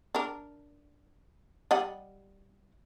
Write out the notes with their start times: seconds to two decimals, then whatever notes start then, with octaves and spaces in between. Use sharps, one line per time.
0.15 D4 A#4
1.71 G3 D#5 F#5